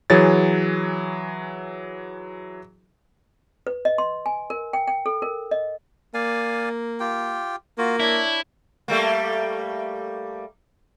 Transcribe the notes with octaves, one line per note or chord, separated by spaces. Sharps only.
E3 F#3 G#4 C#5 A6
B4
D#5
C6
G#5
A#4
G5
G5
A4
A#4
D#5
A#3 D5 F5 G#5
F4 G4 G5
A#3 F4 F#4
D4 E4 C#5
G3 A3 A#3